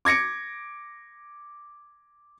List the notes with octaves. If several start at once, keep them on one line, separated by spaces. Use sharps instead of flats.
D6 G#6 A#6 C#7 D7